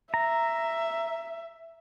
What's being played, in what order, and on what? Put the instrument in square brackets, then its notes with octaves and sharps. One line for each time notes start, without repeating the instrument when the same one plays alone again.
[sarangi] E5 [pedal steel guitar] A#5